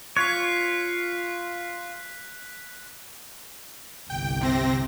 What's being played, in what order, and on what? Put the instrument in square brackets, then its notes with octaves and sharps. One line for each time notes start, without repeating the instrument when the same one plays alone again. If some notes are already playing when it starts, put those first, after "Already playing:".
[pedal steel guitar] F4 C#5 [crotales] F#6 B6
[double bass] G1 C2 [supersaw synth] G5
[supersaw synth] C3 C4 A#6